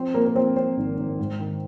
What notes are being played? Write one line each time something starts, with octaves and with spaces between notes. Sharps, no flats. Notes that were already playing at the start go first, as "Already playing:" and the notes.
Already playing: F3 C4 C5
F3 A#3 A#4
A#4
F3 C4 C5
F3 C4 C5
G#1
G#1
G#2
D#3